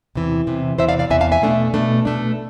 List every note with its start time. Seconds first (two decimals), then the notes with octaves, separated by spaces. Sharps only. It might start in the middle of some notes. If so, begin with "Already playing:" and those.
0.15 E2 C3 E3
0.47 E2 C3 E3
0.78 E2 C3 E3 C5 E5
0.89 D5 F5
0.99 D5 F5
1.10 E2 C3 E3 E5 G#5
1.21 F5 A5
1.32 E5 G#5
1.42 B2 A3 D4
1.74 B2 A3 D4
2.05 B2 A3 D4